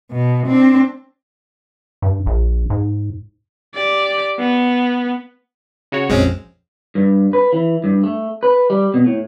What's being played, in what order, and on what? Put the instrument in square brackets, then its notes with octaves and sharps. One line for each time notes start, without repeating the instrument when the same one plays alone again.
[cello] B2
C4 D4
[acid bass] G2
A#1
G#2
[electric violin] G4 D5
B3
[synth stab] C#3 F#4 C#5
[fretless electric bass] A#1 F2 [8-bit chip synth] G#3 C4 C#4
[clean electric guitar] G2
B4
E3
G2
A3
B4
G3
B2
A2